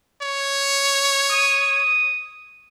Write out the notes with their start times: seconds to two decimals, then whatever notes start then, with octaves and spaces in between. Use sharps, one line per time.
0.22 C#5
1.31 D#6